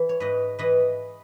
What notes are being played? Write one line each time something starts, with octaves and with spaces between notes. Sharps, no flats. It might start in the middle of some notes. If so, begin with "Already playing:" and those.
Already playing: E3
C#5
G#2 B4 D#5
E3 B4 D#5